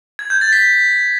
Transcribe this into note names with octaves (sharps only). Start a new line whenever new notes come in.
G#6
G6
A6
B6